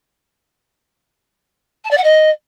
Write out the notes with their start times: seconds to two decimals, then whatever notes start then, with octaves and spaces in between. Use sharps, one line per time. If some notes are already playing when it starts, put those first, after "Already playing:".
1.84 A5
1.90 D5
1.97 F#5
2.03 D#5